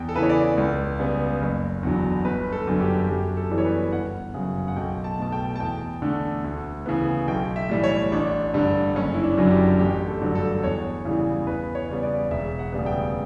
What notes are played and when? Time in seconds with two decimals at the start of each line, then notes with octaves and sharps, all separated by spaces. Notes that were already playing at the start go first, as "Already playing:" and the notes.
Already playing: E2 G5
0.09 A4
0.15 C#3 E3 B4
0.22 C#5
0.29 D5
0.58 C#2
0.99 C#3 G3 B3
1.41 F#1
1.83 E2 D3 F#3
2.25 G1 B4
2.52 A4
2.67 F#2 D3
2.81 G4
3.09 F#2 G4
3.37 A4
3.51 E3 G3 B3
3.58 C#5
3.65 B4
3.93 G1 F#5
4.34 F#2 C#3
4.68 F#5
4.76 B1 G5
5.04 A5
5.18 B2 A3 A5
5.32 G5
5.56 A5
5.60 E2 G5
6.02 D3 A3
6.44 D2
6.86 C#3 E3 B3
7.27 B1 G5
7.56 E5
7.69 A2 E3 G3
7.84 C#5
8.11 A1 D4
8.54 G2 D3 G3
8.95 F#1 C#4
9.14 E4
9.23 D4
9.38 F#2 D3 F#3
9.51 G4
9.79 A1 G4
10.07 A4
10.22 G2 D3 F#3
10.35 A4
10.63 E2 C#5
11.05 C#3 E3 G3
11.47 E2 B4
11.75 C#5
11.89 C#3 G3 B3
12.03 D5
12.31 E1 E5
12.59 F#5
12.72 D2 C#3 G3 B3
12.86 G5